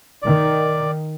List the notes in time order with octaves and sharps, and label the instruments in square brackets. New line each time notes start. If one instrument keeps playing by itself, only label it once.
[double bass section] D#3 [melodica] D5